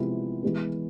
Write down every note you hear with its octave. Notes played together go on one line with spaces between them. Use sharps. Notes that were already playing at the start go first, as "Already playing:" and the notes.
Already playing: C3 F3 G#3 B3 E4
E3 G#3 B3